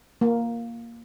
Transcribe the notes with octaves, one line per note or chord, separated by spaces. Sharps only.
A#3